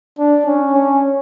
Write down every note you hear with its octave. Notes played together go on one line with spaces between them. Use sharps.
D4
C#4
C#4